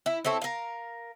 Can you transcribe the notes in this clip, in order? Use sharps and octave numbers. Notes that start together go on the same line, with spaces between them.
E4
C4 E4 A4 C#5
A#4 F5